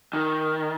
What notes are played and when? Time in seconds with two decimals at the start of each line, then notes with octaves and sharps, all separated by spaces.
0.13 D#3